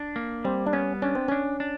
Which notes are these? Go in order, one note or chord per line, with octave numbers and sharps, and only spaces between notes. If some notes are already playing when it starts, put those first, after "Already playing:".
Already playing: D4
A#3
G3 C4
D4
B3 C#4
C#4 D4
C4
C#4 D4
D4